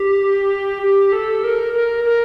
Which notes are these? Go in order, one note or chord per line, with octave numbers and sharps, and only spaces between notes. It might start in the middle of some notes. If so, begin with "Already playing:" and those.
Already playing: G4
G4
A4
A#4
A#4
A#4